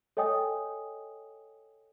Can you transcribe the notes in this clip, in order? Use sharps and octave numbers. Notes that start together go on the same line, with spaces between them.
A4 C#5 D#5 G5 G#5 D#6